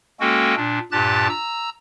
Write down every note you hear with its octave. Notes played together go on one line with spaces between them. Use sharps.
G#3 A#3 C#4 F#4 A4 G5
A#2 D4
G2 A#2 G4 A5 F#6 A6
A#5 E6